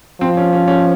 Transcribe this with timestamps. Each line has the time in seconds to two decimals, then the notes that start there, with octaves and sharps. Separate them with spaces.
0.21 F3 C4
0.37 C#4
0.53 C#4
0.68 C#4